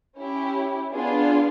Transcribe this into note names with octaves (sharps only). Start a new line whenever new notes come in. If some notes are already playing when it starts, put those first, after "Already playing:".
C#4 E4 G4
B3 D4 F4 G#4